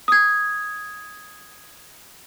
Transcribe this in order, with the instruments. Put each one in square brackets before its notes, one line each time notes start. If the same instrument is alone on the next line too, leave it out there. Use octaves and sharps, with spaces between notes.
[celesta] D#6 G#6